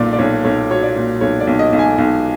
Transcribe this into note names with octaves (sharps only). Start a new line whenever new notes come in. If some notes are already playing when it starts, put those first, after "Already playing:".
Already playing: B1 A#2 D5
D5
B1 C#5
B1 C#5
F#3 C#5
D5
A#2
B1 C#5
D5
B1
D#5
B1
G#5
B1